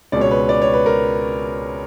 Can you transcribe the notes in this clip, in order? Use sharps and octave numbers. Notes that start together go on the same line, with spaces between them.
C#2 B2 D5
C#5
B4
D5
C#5
B4
A#4